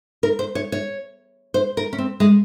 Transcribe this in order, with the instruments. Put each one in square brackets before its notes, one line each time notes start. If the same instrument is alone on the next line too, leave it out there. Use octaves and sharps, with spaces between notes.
[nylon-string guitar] A#4
C5
C#5
C#5
C5
A#4
C#4
C4
G#3